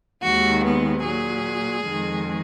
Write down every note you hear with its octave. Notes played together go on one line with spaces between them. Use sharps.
D#2 D#3 G#3 F#4
B3
A#2 F#3 G#4
F2 D#3 G#3